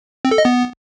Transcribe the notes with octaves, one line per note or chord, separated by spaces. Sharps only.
C4
A4
D#5
B3